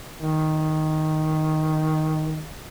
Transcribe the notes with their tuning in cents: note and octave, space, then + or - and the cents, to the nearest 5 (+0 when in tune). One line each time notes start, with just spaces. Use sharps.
D#3 +5